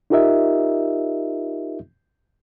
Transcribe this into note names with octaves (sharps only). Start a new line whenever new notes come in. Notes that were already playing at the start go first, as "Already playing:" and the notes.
D#4 F4 G4 A#4 D#5 E5